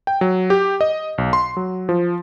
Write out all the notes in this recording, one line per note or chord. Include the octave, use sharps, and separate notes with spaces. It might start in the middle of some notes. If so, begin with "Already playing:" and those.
G5
F#3
G4
D#5
B1
C6
F#3
F3